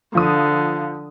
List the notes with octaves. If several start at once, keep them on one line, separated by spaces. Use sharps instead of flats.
D3 F3 D#6